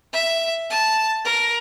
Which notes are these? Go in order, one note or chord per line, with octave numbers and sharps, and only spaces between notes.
E5
A5
A#4